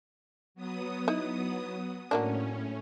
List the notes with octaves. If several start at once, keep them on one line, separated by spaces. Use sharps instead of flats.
F#3 B3 D#6
D#4 E4
A2 F#3 A#3 C#4 D4